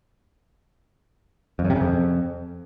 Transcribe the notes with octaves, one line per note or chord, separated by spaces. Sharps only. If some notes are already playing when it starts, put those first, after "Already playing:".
F2
F#2
C3
C#3
F2